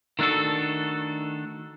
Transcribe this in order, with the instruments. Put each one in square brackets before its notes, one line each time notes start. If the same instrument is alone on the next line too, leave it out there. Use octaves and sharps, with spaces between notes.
[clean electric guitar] D#3 A3 D4 F#4 A4